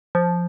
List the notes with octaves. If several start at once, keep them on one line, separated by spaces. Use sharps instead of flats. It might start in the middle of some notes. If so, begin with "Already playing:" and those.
F3